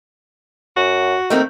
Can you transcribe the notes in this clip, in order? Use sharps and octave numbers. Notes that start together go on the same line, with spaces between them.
F#2 F#4
D#3 A3 A#3 C4